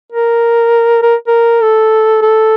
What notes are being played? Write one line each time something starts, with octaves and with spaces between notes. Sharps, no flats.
A#4
A#4
A#4
A4
A4